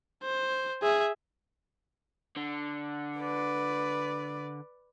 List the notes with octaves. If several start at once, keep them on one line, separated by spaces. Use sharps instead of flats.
C5
G#4 E5
D3
B4 D5